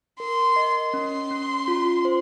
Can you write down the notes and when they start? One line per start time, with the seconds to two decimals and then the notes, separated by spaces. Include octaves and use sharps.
0.20 A#4 C6
0.56 D#5
0.94 C#4 C6
1.31 C#4
1.68 F4
2.05 C5